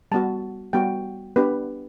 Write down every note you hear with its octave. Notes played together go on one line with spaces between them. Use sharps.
G3 B3 F#4 A5
G3 B3 F#4 G5
B3 D4 G4 B4